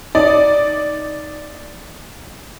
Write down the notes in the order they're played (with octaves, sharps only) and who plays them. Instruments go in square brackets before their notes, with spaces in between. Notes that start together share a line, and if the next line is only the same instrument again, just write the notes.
[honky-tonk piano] D#4 D5